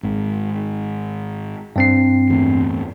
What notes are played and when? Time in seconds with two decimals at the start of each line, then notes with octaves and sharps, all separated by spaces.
0.03 G#1 G#2
1.76 G2 C4 C7
2.30 E2 A2